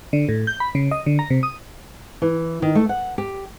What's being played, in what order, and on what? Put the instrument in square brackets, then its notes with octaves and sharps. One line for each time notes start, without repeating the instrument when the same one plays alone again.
[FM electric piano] D3
A2
G6
B5
C#3
D#5
D3
A#5
C3
D#6
[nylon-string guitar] E3
D#3
A3
F#5
G4